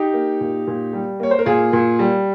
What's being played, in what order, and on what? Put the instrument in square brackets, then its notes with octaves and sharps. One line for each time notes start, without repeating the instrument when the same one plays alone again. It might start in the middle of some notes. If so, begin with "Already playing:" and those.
Already playing: [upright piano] D#4 G4
A#3
A#2
A#2
G3
A#3 C#5
C5
A#4
A#2 F4 G#4
A#2
G3